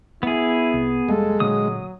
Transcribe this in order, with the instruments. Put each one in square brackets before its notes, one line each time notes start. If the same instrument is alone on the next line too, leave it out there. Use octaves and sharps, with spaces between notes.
[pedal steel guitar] B3 G#4 [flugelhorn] E4
[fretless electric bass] C2
[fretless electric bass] F1 G3 A#3 [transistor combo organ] G#3 [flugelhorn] A4
[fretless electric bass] A#2 D3 A#3 [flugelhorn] F#3 [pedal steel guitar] D#6